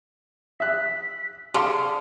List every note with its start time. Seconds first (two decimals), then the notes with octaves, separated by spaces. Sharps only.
0.60 E5 F#6 B6
1.54 D3 G#4 F5 A5 C6